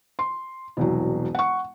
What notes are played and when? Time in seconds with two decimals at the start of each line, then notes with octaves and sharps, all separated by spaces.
0.19 C6
0.77 E1 C2 F#3
1.35 F#5 C#6